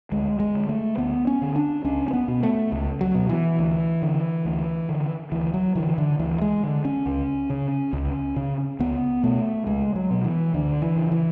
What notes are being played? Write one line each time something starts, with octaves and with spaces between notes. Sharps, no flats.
D2 G#3
G#3
D3
A3
D2 B3
C#4
D3
D4
C#2 C#4
C#4
B3
B2
A3
C#2
F#3
B2
E3
D2
D3
D2
D3
D2 E3
F#3
D3 E3
D3
D2 E3
G#3
D3
C#4
C#2
C#3
C#2
C#3
C#2 B3
B2 A3
C#2 G#3
F#3
B2
E3
D2 D3
E3
C#3
E3